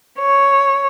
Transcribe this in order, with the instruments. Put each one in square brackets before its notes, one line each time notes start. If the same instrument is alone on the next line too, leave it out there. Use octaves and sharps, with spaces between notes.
[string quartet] C#5